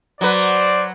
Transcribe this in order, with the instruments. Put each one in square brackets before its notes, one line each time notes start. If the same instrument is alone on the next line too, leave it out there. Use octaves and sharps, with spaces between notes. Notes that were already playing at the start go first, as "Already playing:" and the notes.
[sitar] F#3 B4 [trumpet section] C5 D5